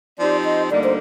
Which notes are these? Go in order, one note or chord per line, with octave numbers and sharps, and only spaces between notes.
F3 C4 D#4 G4 C5 D5
D#5
D2 D3 G3 A#3 D#4 D5
C5